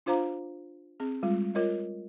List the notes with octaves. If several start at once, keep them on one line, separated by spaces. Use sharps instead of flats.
D4 F4 C5 F5 A#5 D6
C4 G#4
G3 G#3 F4
F4 A#4 C#5 D#5